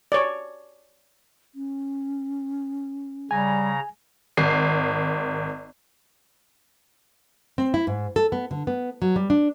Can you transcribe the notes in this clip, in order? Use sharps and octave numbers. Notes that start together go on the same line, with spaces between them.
C#5 D5
C#4
C#3 G3 G#5 A#5
G#1 C7
C4
E4
G#2
A4
B3
D3
B3
F#3
G3
D4